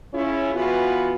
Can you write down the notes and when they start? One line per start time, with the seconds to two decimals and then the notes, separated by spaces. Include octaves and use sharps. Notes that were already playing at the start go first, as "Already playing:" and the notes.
0.13 C#3 C#4 E4 F4 C#5
0.54 E3 B3 F4 F#4